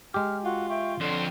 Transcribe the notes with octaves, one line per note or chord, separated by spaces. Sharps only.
G#3 G4 F6
F4 F#4
E5 G5 C#6
F2 D3 C5 C#5